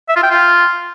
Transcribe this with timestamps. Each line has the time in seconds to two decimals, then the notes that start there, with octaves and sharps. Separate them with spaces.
0.09 E5
0.16 F4
0.23 G5
0.31 F4